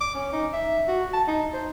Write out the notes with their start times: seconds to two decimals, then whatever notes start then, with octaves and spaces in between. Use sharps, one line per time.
0.01 D6
0.15 C#4
0.33 D#4
0.53 E5
0.88 F#4
1.13 A5
1.28 D#4
1.54 C5